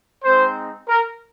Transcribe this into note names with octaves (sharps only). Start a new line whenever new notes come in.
G#3 C4 D#4 C5
A#4